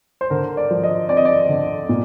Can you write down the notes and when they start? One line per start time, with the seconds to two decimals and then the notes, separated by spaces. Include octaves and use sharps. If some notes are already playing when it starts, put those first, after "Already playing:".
0.21 C5
0.30 D3 A#4
0.57 D5
0.71 F3
0.83 D#5
1.09 C4 D5
1.17 D#5
1.25 D5
1.49 D3
1.89 A#2